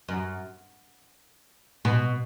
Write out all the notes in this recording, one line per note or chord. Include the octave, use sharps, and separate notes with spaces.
F#2
B2